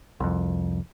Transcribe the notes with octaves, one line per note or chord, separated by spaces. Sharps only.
C2 F2